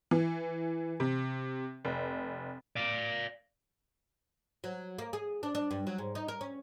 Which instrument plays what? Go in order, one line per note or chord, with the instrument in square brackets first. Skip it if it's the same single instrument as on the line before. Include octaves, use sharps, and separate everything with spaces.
[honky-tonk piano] E3
C3
F1
[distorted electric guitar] D5 F5
[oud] F#3
A#3
G#4
D4
D4
G2
F#3
G#2
D#4
A#4
C#4